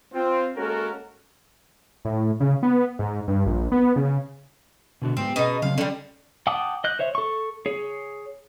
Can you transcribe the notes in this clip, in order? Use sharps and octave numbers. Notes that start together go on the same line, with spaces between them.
C4 F4
G#3 A#3 C#4 F#4 A4 A#4
A2
C#3
B3
G#2
G2
A#1
B3
C#3
B2 D3 F#4
G#2 B3 C4 G4
B2 C#4 D#4 G#4
C#3 F#3 C4 F5
D3 G3 C#4
F#5 G5 A5 D6 D#6
D#5 F#6 G6
C5 C#5 E5
A4 C#6
G#4 C#5